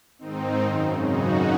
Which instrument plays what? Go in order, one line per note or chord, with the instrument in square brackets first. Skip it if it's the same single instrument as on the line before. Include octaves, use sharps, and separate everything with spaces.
[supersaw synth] G#2 D#3 C4 D#4
F#2 C#3
F#2 C#3 D#4 F#4